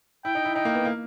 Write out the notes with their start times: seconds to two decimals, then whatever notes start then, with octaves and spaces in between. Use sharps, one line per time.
0.25 E4 G5
0.35 D#4
0.45 E4
0.55 D#4 G5
0.65 A#3
0.75 B3
0.85 A#3